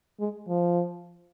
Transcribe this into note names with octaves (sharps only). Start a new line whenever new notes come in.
G#3
F3